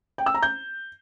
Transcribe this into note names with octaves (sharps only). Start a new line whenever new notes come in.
G5
E6
A#5
G6